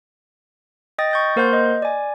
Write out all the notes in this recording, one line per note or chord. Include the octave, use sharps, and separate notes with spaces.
D#5 G5 D#6 A6 A#6
C#6 G6 A6
A#3 A#4 C5 F#5 C6 G6
D#5
D5 G#5